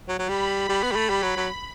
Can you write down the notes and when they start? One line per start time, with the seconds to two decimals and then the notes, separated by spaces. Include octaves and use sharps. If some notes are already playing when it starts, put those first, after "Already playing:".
0.08 F#3
0.19 F#3
0.28 G3 B5
0.69 G3
0.83 B3
0.91 G3
0.96 A3
1.09 G3
1.23 F#3
1.36 F#3